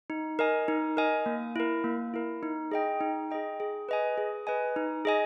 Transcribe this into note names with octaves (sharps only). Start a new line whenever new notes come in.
D#4
A#4 D#5 G#5
D#4
A#4 D#5 G#5
A#3
E4 A#4
A#3
E4 A#4
D#4
G#4 D#5 G5
D#4
G#4 D#5 G5
G#4
B4 D#5 G#5
G#4
B4 D#5 G#5
D#4
G#4 D#5 G#5